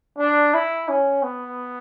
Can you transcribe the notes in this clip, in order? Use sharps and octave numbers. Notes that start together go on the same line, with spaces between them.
D4
E4
C#4
B3